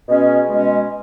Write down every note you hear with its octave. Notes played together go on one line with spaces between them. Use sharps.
B2 G#3 C#4
B2 G#3 C#4